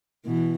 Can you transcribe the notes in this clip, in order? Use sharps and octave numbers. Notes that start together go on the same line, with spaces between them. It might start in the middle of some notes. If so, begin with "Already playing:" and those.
B2 E3